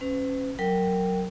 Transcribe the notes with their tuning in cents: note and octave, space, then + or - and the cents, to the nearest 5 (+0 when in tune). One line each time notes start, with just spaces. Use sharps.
C#4 -25 B4 +45
F#3 +0 A#4 -20 G5 +0